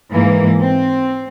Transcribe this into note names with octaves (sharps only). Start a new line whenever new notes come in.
G#2 E3 A#3
C4